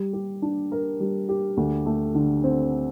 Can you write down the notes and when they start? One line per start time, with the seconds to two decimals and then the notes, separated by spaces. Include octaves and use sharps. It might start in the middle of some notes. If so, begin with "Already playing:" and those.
Already playing: G3
0.13 G4
0.42 D4
0.72 A#4
1.00 G3
1.29 G4
1.57 D2
1.86 A3
2.15 D3
2.44 C4